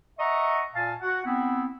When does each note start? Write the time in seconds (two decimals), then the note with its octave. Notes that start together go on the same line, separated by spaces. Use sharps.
0.18 D#5 E5 F#5 A#5 C#6
0.74 A#2 F5 G#5 A5
1.01 F#4 F#5
1.25 B3 C4 E4